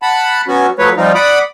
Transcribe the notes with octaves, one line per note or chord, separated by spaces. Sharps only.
F#5 A5 B5
F#3 B3 C#4 F#4
F3 F#3 A3 B4 C#5
F3 G3 C4 D#4 F4
D5 F#5 B5 D6 D#6